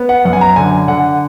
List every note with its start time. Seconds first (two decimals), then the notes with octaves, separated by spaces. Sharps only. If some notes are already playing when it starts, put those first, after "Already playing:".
Already playing: B3
0.09 F#5
0.25 F#2 F#5
0.33 G#5
0.41 A#5
0.56 D3 G#5
0.72 G#5
0.88 D3 F#5